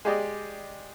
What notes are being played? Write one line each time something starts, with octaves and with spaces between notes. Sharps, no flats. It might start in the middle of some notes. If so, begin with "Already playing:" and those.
G#3 G4 D5 D#5